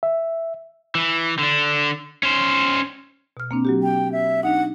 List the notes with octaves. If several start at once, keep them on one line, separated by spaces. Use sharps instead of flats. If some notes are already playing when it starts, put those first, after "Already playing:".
E5
E3
D3 D4
C#4 C5
B2 F6
A#3 C4 D4
F#3 F#4 G4
G5
E5
D4 D#4 F#5